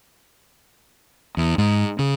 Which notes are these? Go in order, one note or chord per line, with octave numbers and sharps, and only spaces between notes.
E2
G#2
C#3